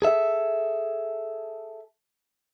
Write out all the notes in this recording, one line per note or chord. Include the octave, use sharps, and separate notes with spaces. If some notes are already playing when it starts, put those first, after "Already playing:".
G#4 A4 E5